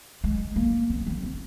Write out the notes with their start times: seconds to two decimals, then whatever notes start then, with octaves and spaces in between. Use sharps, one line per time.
0.24 G#3
0.56 A#3
0.90 C4
1.07 C4
1.23 C4